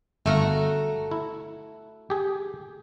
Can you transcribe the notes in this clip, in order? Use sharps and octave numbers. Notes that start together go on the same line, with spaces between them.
G1 A3 F#4 F5 A#5
E4
G4 G#4